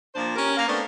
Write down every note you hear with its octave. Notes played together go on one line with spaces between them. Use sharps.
A#2 F3 D4 C5
C#4 G4 A#4
A#3 F5
A3 B3 C4 D4